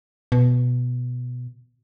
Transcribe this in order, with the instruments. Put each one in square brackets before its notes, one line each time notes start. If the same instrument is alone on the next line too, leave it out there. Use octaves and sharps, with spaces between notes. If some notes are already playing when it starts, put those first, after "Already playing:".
[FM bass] B2